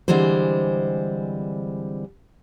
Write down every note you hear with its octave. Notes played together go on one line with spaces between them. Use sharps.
D3 E3 G3 G#3 C4 C5